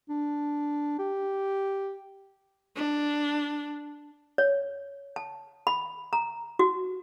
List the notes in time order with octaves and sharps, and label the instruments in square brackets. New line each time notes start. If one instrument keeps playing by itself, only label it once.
[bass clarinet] D4
G4
[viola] D4
[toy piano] C#5
A5
B5
A#5
F#4